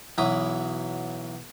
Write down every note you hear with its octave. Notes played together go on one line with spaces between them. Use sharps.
B1 E3 F#3 B5 D#6